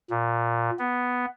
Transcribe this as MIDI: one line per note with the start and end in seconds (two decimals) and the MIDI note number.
0.10 0.70 46
0.79 1.26 59